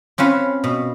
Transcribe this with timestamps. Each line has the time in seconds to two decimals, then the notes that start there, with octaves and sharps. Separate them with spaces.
0.18 C4 C#4 F4 B4
0.64 B2